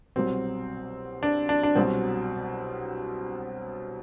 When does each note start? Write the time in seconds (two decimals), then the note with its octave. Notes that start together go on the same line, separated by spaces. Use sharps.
0.16 C2 B2 F#3 C4
1.23 D4
1.49 D4
1.63 D4
1.75 C2 B2 F#3 C4